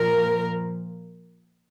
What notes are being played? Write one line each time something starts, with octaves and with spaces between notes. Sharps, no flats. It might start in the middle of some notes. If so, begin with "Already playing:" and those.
Already playing: A#2 F3 A#4